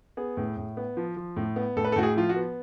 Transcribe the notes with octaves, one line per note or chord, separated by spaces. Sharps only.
B3 G#4
A2
A2
B3
F3
F3
A2
B3
A2 A4
B4
A4
A2 F#4
G#4
F3 F4
F#4
B3